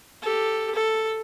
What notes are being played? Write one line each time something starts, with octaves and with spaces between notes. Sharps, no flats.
G4 A4
A4